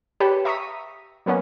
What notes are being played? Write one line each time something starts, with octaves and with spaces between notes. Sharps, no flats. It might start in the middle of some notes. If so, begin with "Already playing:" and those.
G4 B4 C#5 G5 A5
E5 A#5 C#6 D#6 B6 D#7
F#3 A#3 B3 C#4